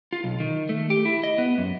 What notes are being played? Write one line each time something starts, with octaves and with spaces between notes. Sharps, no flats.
F4
B1
D#3
A3
G4
E4
D#5
B3
F#2